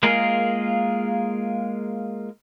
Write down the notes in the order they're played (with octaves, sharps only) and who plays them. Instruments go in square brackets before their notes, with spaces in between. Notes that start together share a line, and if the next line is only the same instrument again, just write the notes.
[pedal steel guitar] G#3 A#3 F4 G#4 A#4